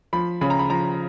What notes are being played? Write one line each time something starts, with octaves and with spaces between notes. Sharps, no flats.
F3 B5
C#3 B5
A#5
B5
F3 A#5